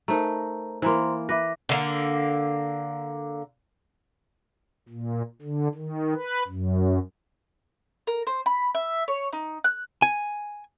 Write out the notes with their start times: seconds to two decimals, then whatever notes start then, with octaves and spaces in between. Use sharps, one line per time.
0.08 A3 D#4 A#4 C5 A#5
0.82 E3 A#3 C5 A#5 C6
1.29 B4 E5 D6 A#6
1.69 D3 A#3
4.89 A#2
5.42 D3
5.75 D#3
6.14 B4
6.48 F#2
8.07 A#4
8.27 C5
8.46 B5
8.75 E5
9.08 C#5
9.33 D#4
9.64 F#6
10.02 G#5